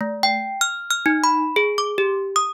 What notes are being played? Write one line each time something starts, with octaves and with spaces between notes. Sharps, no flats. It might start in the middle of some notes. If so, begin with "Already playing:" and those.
A3
G5
F6
F6
D#4
B5
G#4
D6
G4
D#6